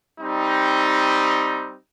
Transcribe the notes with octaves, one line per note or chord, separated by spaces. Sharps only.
G3 C4 D#4